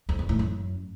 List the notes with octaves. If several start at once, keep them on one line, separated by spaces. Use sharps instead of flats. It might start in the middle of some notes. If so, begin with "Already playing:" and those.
F2
E2
A2
F#2